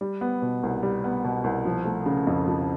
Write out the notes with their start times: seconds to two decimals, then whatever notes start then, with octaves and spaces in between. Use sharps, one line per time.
0.01 G3
0.21 B3
0.42 B2
0.63 C2
0.83 G3
1.04 B3
1.24 B2
1.44 C2
1.65 F3
1.85 A3
2.06 C#3
2.27 F2
2.48 F3